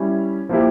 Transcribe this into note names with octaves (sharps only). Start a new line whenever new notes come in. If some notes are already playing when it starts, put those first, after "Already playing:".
Already playing: G3 C#4 E4
F3 A#3 E4 G4